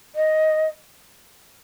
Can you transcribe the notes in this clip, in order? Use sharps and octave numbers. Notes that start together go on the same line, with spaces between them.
D#5